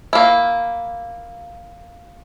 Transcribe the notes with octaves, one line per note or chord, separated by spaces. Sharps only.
A#3 E4